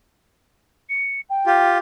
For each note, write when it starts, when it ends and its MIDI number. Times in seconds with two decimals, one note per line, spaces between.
0.89 1.21 97
1.30 1.69 79
1.46 1.78 65
1.46 1.78 67